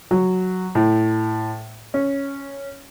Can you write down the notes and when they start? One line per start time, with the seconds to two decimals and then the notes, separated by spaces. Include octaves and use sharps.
0.11 F#3
0.75 A2
1.94 C#4